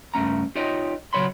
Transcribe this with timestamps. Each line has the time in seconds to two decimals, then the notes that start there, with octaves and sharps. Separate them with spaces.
0.14 C#2 G2 A3 C#4 A#5
0.55 D#4 F4 G4 C#5 D#5
1.13 A#2 C#3 F#3 C#5 B5 C6